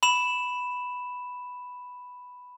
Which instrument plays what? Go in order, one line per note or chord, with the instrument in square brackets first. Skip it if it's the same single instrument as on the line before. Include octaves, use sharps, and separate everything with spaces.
[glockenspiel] B5 E7